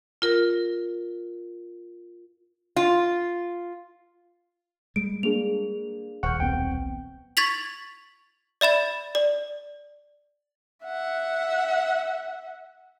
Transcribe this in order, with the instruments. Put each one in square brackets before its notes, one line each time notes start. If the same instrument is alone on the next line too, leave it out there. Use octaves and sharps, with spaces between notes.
[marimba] F4 A#4
[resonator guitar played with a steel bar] F4
[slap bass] G3 G#3 [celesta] D7
[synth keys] A#3 D4 [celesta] G#4 F7
[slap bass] D#1 [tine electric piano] F#5 [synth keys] C#6 F6 G6
[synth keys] B1 B3 C4 [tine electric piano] G5
[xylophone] C#6 G#6 A6 B6 F7 F#7
D5 E5 B5 A6
D5
[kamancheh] E5 F#5